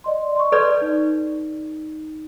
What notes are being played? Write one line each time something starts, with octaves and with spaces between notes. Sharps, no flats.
D5 D#5 C6
C6 C#6
A4 B4 D5 G6
D#4